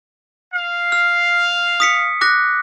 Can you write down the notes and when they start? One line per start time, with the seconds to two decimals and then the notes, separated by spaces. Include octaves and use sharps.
0.53 F5
0.92 F6
1.80 D#6 B6 C#7
2.21 D6 F#6 A#6